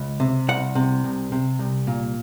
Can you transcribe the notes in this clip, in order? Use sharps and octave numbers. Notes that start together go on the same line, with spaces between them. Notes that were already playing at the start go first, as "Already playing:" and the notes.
Already playing: C#2
C3
C2 F#5
C3
C2
C3
C2
A#2